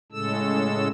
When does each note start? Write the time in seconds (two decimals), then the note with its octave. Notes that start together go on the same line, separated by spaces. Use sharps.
0.12 A2 C#3 G#3 A4 E6